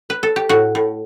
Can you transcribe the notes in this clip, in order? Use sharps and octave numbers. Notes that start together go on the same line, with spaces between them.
B4
A4
G4
A2 F#4
A2